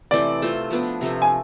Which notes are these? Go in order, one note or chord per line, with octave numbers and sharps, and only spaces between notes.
C3 E3 A3 C4 D5
A3 C4 F4 A4
F3 B3 D4
C3 F3 A3
G#5